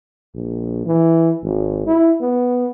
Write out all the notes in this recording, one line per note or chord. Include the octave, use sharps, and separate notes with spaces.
A#1
E3
G#1
E4
B3